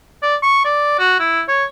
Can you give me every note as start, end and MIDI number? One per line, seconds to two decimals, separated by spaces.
0.23 0.36 74
0.43 0.63 85
0.65 0.96 74
0.99 1.15 66
1.20 1.42 64
1.49 1.65 73